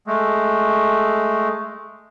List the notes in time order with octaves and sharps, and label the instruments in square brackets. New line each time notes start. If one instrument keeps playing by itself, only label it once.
[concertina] G#3 A3